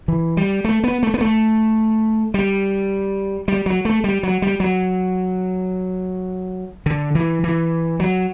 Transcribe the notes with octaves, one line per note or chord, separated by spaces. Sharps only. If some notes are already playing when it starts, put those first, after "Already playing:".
E3
G3
A3
B3
A3
B3
A3
G3
G3
F#3
A3
G3
F#3
G3
F#3
D3
E3
E3
F#3